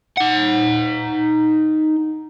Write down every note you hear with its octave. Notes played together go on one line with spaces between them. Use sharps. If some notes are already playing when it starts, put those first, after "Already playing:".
D#4 F#5